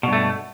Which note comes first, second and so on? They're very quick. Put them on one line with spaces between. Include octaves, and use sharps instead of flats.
B2 G2 A3